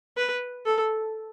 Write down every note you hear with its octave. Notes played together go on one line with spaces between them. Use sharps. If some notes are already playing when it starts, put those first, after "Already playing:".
B4
A4